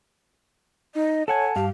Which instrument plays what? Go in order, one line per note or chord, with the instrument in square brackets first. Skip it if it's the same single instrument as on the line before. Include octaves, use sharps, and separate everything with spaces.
[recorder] D#4 [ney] D#5
[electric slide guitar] A4 F#5 G#5 [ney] C#5 [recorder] A5
[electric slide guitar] G2 F5 [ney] G4